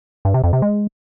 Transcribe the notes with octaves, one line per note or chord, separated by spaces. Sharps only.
G2
C3
F2
C3
G#3